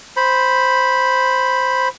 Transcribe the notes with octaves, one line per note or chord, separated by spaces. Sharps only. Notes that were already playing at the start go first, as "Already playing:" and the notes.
C5 B5